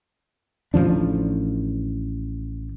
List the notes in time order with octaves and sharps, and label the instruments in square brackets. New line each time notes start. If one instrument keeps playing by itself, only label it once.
[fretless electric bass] A1 D#3 F3 D4